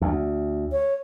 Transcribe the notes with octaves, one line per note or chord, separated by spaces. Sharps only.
D2
C#5